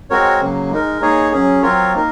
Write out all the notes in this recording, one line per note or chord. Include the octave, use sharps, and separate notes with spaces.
G#3 C4 F#4 A#4 C#5
C#3 F#3 A#3
G#3 D#4 A#4
A#3 D#4 G#4 C#5
F#3 C#4 G#4
F#3 C4 F4 A#4 C#5
A#3 D#4 A#4